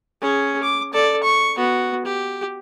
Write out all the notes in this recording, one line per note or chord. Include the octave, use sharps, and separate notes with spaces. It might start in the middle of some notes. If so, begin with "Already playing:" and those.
C#4 G#4
D6
A4 D5
C#6
B3 F#4
G4